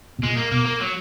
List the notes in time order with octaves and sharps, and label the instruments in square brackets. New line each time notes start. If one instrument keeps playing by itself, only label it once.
[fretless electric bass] B2
[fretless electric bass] A#2 [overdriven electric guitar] G#3
[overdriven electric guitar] A#3
[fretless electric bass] B2 [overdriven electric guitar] A#3
[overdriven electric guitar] A#3
F#3